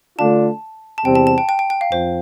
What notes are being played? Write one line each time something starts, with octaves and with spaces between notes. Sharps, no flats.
D3 A3 D4 F4 A5
A5
E2 C3 G3 C4 G4 G5
A5
A5
G5
G5
G5
G5
F5
F2 C5